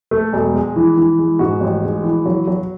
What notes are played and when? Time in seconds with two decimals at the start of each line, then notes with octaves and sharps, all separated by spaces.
0.11 A3
0.33 E1
0.54 G#3
0.76 E3
0.97 E3
1.18 G#3
1.39 G#2 F#4
1.61 A1
1.83 G#3
2.04 E3
2.26 F#3
2.47 F#3